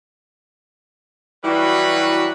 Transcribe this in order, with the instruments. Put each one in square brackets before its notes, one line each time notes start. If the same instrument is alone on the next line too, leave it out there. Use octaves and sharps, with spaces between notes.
[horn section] E3 F#3 G3 E4 F#4 B4